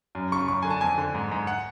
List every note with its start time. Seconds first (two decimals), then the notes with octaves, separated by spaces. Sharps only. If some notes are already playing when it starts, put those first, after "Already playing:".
0.15 F#2
0.32 C#3 C#6
0.48 F#2 C#6
0.63 D3 G#5
0.70 A5
0.81 F2 G#5
0.98 D3
1.14 G#2
1.32 G#2
1.47 F#5